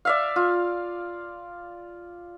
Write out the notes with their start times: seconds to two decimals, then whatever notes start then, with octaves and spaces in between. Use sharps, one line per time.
0.05 D5 E5 F5
0.36 F4